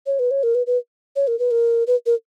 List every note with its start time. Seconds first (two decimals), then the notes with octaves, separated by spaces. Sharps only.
0.06 C#5
0.19 B4
0.31 C#5
0.43 A#4
0.55 B4
0.67 B4
1.16 C#5
1.27 A#4
1.39 B4
1.51 A#4
1.87 B4
2.06 A#4